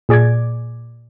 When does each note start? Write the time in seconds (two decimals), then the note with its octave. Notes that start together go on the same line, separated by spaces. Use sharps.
0.09 A#2 G#4 D5 D6 G#6